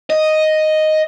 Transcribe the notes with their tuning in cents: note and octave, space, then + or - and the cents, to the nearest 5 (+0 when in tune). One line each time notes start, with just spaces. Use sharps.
D#5 +0